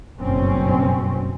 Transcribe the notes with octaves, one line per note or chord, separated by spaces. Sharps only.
F#1 G2 B2 C4 C#4